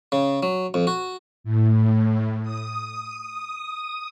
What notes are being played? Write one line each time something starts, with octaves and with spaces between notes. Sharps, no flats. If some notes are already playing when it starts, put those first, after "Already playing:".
C#3
F#3
F2
F#4
A2
D#6